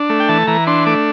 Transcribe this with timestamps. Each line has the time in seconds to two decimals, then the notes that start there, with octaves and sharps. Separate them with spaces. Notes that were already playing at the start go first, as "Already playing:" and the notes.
Already playing: D4
0.09 A3
0.20 G5
0.29 E3 A5
0.47 E3 A#5
0.67 D4 C6
0.86 A3 D6